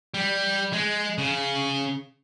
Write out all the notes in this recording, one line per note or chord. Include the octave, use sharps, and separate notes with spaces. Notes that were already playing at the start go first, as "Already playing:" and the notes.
G3
G#3
C#3